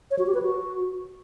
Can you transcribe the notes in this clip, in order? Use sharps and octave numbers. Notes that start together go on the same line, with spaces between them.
C#5
F#4
G4
B4
F#4